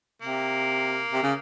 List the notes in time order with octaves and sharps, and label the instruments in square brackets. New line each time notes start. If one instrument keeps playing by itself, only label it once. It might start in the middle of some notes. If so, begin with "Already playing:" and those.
[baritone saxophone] C3 [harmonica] A#3
[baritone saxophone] C3
C#3